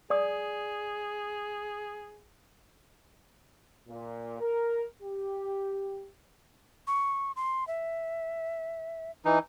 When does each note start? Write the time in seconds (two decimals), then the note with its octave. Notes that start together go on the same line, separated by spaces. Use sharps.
0.10 G#4 D5 C#6 D#6
3.88 A#2
4.40 A#4
5.03 G4
6.87 C#6
7.36 C6
7.67 E5
9.25 E3 D#4